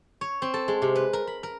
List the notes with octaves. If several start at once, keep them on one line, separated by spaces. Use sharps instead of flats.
C#5
C4
A4
G#3
C3
B4
A#4
B5
A#4